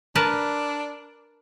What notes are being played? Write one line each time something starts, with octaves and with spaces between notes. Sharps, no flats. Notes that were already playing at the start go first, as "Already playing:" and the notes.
D4 A#4 B4 A5